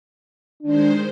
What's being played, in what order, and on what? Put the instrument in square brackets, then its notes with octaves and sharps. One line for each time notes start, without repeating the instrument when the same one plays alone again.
[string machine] D#3 G#3 C5 [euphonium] D4